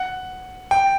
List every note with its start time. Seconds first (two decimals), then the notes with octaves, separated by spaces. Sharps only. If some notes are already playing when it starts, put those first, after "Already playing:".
Already playing: F#5
0.71 G5